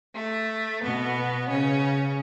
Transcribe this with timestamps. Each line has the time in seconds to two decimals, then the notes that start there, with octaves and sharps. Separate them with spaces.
0.15 A3
0.82 B2 B3
1.48 C#3 C#4